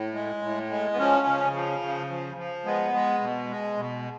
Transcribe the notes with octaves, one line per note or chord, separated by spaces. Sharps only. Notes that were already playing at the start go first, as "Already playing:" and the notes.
Already playing: A2
G#3
A2
G#3
B3
F3 C#4
C#3
F3
C#3
F3
F3
G#3 B3
G#3
B2
G#3
B2